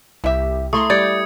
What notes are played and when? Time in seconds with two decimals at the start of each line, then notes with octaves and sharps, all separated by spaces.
0.24 C2 E4 G4 E5
0.73 A3 E4 A#5 C6 C#6 D#6
0.90 G3 D5 G6 G#6 C#7